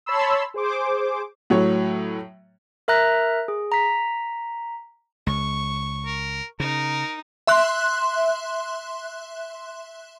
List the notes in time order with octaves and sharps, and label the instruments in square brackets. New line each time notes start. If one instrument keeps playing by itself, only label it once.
[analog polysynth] C#5 A5 B5 C6 E6
G#4 C5 D6
[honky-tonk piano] A2 F#3 C#5
[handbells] A#4 E5 A#5 F#6 A#6
G#4
A#5 B6
[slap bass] C#2 [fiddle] C#6
[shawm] A#4
[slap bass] C#3 [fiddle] D#4 [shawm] A#4
[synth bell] E5 C6 F#6